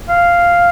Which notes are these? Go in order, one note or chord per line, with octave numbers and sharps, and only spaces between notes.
F5